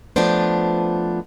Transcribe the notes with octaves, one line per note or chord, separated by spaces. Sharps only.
F3 A3 B3 D4 C5